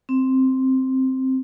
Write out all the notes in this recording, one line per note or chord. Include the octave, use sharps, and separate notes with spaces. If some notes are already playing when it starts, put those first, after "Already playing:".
C4